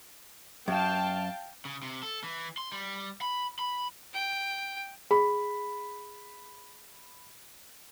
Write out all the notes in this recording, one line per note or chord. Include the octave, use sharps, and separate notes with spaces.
F#2 F5 G5 A5
C#3
C3
A4
E3
C6
G3
B5
B5
G5
G#4 B5